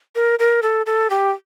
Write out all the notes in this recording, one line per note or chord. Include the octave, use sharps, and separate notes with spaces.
A#4
A#4
A4
A4
G4